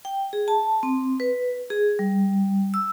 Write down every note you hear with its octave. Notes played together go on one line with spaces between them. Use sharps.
G5
G#4
A5
C4
B4
G#4
G3
E6